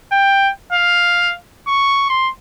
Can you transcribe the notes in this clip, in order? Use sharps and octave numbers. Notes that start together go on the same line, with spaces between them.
G5
F5
C#6
C6